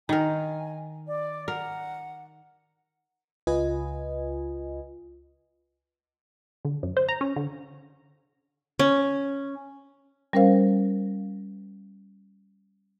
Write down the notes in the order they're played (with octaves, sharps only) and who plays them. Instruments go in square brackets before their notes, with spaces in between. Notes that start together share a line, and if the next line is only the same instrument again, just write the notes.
[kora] D#3 A#4 [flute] G#5
[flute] D5
[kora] A#4 [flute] F#5
[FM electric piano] C#2 F4 B4 D#5 G#5
[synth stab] D3
F#2
C5
A#5
C#4
D3
[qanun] C#4
[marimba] G3 C#4 A#4 C5 F5